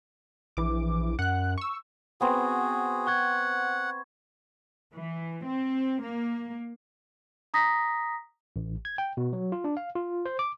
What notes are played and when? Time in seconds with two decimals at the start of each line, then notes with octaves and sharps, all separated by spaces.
0.57 A#1 E3 D6
1.19 F#2 F#5 F#6
1.58 C#6 E6
2.21 B3 C4 F#4 G#4
3.07 F#5 C#6 G#6
4.93 E3
5.44 C4
6.01 A#3
7.54 A#5 D#6 A#6 B6
8.56 A1
8.85 G#6
8.98 G5
9.17 B2
9.33 F#3
9.52 F4
9.64 D4
9.77 F5
9.95 F4
10.25 C5
10.39 D6